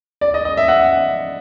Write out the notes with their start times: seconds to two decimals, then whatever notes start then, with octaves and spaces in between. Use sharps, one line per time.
0.21 D5
0.34 D#5
0.45 D#5
0.57 E5
0.68 F#5